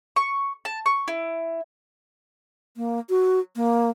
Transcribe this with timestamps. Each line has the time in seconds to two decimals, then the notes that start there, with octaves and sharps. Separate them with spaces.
0.16 C#6
0.65 A5
0.86 C#6
1.08 E4
2.77 A#3
3.10 F#4
3.56 A#3